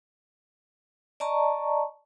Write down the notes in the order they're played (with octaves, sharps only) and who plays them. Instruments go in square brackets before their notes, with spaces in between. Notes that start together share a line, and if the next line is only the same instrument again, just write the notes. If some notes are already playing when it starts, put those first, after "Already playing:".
[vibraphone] D5 D#5 A5 A#5 C#6